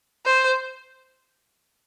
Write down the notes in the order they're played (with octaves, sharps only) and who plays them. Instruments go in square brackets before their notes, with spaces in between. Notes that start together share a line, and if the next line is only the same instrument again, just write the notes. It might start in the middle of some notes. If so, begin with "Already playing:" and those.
[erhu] C5